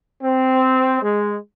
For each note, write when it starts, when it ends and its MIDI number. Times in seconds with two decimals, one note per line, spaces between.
0.23 1.02 60
1.02 1.36 56